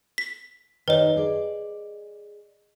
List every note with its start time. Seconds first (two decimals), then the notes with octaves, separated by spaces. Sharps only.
0.18 B6
0.88 D#3 G4 A#4 B4 C#5 D#5 G5
1.16 G#4 D5